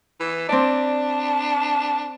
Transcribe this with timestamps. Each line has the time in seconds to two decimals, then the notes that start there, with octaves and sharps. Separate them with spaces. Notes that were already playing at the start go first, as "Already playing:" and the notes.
0.20 E3
0.49 C4 D4 D5